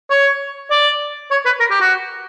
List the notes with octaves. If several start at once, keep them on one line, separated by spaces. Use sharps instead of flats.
C#5
D5
C#5
B4
A#4
G4
F#4